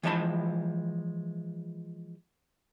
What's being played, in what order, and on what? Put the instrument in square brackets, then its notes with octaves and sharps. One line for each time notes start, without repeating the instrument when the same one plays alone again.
[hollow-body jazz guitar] E3 F3 G#3 D5 A5 B5